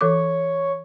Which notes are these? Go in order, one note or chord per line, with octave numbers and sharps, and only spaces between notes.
E3 A4 C#5 D6